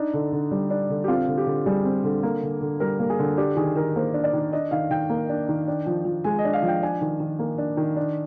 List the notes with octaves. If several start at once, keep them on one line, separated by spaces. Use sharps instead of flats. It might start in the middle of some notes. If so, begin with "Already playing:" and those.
Already playing: D4 D#4
D3
D3
G3
D4
D3
G4
C4 F4
D3
G4
D3
G3 G#4
C4
D3
A#3
D3
D3
G3 A#4
A#3
G#4
D3
D4 G4
D#3 G#4
D#3 A#4
A#3 C5
D4
D5
D#3
D4 D#5
D#3 F5
D#3 G5
A#3
D4
D#3
D4
F3
F3
G#3 G#5
D#5
D4
F5
F3
G5
D4 G#5
D#3
D#3
A#3
D4
D#3
D4